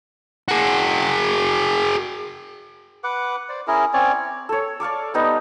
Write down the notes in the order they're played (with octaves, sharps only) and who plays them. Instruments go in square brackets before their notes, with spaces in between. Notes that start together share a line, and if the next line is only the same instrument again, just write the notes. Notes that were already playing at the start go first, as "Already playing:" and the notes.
[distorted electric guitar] F#4 G#4
[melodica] B4 F#5 D6
C5 D5
C#4 E4 G#4 A#4
C4 C#4 C#5 D5
[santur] A4 C#5
D5 F5 C#6 D6
G3 B3 D#4